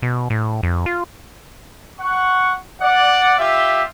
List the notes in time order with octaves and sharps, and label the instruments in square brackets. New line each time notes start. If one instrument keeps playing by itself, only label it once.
[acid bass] B2
A2
F2
F4
[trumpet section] F#5 C#6
D5 F#5
F4 G4 E5